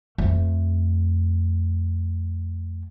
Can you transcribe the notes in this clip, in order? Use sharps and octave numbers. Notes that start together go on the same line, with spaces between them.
F2 A3